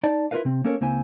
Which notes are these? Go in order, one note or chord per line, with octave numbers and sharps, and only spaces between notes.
D#4 D5 A5
E4 F4 G#4 A#4 B4 F5
C3 C4
A#3 C#4 A4 A#4 C#5
C#2 A#3 C4 E4 G#5